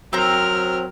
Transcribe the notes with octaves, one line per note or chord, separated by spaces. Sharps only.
F#3 C4 A#4 A#5 F6